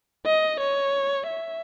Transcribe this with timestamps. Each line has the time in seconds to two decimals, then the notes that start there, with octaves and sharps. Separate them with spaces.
0.26 D#5
0.60 C#5
1.27 E5